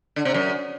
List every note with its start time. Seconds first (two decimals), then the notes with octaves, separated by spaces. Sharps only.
0.16 D3
0.25 C3
0.34 F#2